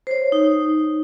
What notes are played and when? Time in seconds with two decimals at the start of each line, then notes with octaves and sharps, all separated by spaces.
0.07 C5 C#5
0.32 D#4